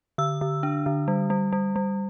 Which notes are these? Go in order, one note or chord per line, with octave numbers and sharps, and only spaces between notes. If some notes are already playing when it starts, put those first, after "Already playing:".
D3 E6
D3
D4
D3
G3
G3
G3
G3